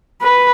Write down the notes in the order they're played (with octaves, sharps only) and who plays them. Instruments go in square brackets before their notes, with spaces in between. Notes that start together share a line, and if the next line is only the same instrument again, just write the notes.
[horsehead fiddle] B4